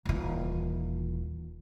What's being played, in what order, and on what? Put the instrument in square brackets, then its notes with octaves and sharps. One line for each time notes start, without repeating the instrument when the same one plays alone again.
[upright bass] D#1 E3